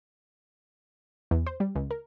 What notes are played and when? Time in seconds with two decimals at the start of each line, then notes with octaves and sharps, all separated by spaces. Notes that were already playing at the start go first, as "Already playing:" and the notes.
1.31 E2
1.47 C5
1.60 G3
1.75 C#2
1.91 A#4